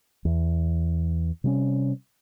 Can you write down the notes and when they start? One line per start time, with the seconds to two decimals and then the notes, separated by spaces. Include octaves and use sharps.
0.25 E2
1.44 C3 G3 C4 C#4